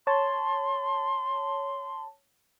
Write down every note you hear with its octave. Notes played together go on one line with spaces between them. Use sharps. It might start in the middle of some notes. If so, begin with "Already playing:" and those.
C#5 A5 C6